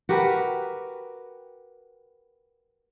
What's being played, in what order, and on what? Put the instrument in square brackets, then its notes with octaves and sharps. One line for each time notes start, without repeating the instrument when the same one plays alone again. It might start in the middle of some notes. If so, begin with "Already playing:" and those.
[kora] F#4 G4 A#4 B4